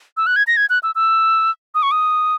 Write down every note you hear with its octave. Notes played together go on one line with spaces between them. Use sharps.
E6
F#6
G#6
A#6
G#6
F#6
E6
E6
D#6
C#6
D#6